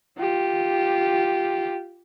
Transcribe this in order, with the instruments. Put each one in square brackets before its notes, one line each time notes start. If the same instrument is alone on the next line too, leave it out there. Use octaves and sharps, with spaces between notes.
[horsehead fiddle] F4 G4